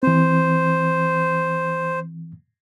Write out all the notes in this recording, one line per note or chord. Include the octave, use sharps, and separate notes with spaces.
E3 C4 C5